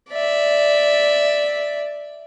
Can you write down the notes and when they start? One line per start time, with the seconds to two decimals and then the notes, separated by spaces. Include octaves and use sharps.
0.11 D5 E5